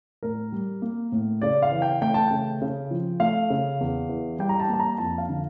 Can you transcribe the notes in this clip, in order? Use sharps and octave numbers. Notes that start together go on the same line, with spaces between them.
A2 A#4
G3
A#3
A2
C#3 D5
F5
E3
G5
A3 G5
A5
C#3 G5
C#3
F3
A3 F5
C#3
E2
E3
G3 G5
A#5
A5
A#3
A5
A#5
F2 A5
F5
D3